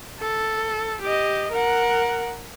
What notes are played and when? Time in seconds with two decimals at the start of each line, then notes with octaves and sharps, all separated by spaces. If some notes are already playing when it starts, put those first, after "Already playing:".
0.19 A4
1.01 G4 D#5
1.51 A#4 F#5